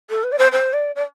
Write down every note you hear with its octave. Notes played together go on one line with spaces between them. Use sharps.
A4
B4
D5
C5
C5
D5
D5